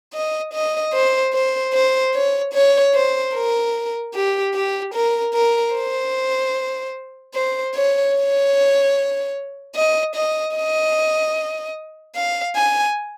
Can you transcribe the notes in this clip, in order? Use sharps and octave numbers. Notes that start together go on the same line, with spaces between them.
D#5
D#5
C5
C5
C5
C#5
C#5
C5
A#4
G4
G4
A#4
A#4
C5
C5
C#5
C#5
D#5
D#5
D#5
F5
G#5